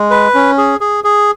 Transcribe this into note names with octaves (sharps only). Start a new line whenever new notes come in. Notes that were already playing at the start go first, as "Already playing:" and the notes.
Already playing: G#3
B4
C#4
G#4
G#4
G#4